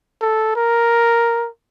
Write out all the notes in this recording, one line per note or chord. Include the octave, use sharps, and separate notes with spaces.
A4
A#4